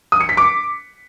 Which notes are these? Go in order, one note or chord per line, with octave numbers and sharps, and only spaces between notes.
D#6
C#7
B6
D6